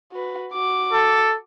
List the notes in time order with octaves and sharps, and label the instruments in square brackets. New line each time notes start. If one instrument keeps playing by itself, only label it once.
[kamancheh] F#4 B4
F#4 D6
[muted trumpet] A4